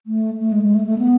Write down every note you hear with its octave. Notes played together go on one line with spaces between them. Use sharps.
A3
A3
G#3
G#3
A3
A3
B3